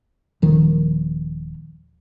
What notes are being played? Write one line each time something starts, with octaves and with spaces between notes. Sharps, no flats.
D#1 D#3 F3